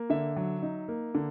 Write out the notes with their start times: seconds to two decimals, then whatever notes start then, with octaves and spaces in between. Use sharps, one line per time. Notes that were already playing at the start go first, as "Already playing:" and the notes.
Already playing: A#3
0.10 D3 E5
0.36 F#3
0.63 D#4
0.88 A#3
1.15 D3